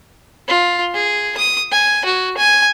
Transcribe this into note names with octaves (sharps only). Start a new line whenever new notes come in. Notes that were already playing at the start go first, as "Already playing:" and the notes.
F4
G#4
D#6
G#5
F#4
G#5